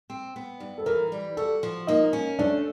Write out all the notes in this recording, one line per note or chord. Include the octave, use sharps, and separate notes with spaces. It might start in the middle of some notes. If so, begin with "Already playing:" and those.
C4
B3
G2
A4
E3 A#4
G3
F#4 A4
F3
A#3 D#4
C#4
A3 D4